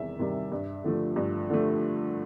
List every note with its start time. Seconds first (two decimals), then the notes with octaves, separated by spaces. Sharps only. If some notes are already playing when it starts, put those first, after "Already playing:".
Already playing: E2 C3 D#3 G3 E5
0.19 C3 D#3 G3
0.52 G2
0.84 D3 F3 A3
1.16 G2
1.50 D3 F3 A3